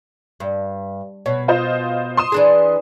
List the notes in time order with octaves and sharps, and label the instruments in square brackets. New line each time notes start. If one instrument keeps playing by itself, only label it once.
[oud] G2
[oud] B2 [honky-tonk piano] C#5
[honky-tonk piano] F4 C5 D#5
C6 D#6 E7
[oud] E3 D4 G#4